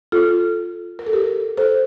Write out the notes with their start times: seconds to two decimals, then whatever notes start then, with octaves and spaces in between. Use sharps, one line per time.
0.12 F4 A4
0.99 A#4
1.07 A4
1.13 G4 A#4
1.57 A4 C5